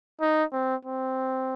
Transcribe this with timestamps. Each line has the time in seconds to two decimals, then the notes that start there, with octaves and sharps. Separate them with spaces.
0.21 D#4
0.53 C4
0.85 C4